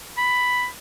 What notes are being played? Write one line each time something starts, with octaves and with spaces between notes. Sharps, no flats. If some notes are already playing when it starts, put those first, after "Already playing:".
B5